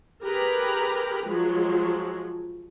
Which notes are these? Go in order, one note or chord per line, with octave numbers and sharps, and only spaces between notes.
G4 G#4 A#4 B4 A#5 B5
F3 F#3 G#3